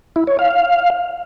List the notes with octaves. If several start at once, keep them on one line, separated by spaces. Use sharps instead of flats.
E4
C#5
F5